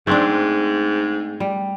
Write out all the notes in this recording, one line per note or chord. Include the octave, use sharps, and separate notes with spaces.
G#2 A3 C4 D4
G3